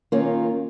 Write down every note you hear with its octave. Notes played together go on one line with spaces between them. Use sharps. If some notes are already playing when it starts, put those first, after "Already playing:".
D#3 A#3 C#4 F4